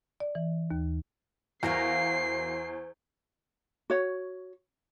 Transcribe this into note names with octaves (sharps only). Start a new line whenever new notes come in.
D5
E3
D#2
E2 F#4 A#4 C5 F5 C7
F#4 C#5